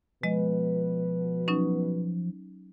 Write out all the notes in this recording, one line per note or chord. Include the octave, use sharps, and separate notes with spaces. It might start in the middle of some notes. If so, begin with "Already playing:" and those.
B2 F3 G#3 B4 D#5
F#3 C#4 D#4